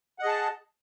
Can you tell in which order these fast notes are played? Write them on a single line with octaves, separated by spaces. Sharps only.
F#5 D#5 G#4 A5